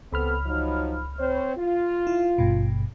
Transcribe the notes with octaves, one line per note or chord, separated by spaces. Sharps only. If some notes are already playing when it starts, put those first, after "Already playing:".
C#2 B3 C4 A4 B5 F6
F3 F#3 D#4
C4 C5 C#5
F4
E4
G#1 G2 B2